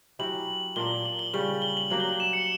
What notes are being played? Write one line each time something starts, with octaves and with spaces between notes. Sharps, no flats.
F#3 C#4 E4 G4 F#7
A#2 A#3 D4 G7
F#7
G7
C#3 G3 C#4 F#7
G7
F#7
F#3 A#3 D4 G4 F#7
G7
F#7
E7
C#7